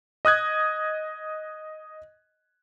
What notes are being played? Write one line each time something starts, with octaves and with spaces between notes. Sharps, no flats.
D#5 D#6 F#6 G#6